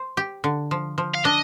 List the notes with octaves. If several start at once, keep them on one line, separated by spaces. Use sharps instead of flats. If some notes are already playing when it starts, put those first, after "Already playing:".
Already playing: C5
G4
D3
F3
F3
F5
D4 D#5